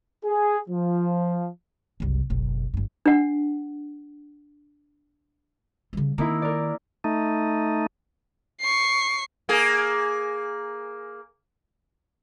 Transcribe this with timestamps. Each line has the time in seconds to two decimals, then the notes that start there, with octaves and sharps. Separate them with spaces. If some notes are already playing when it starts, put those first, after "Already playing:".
0.25 G#4
0.69 F3
2.00 F#1 C2
2.30 F#1 B1
2.74 G1 G2
3.06 D4 F#5
5.93 C#3 G3
6.18 D#3 A#3 D#4 E4
6.42 A#4 D5
7.04 A3 D#4
8.61 C#6 C7
9.49 A#3 G#4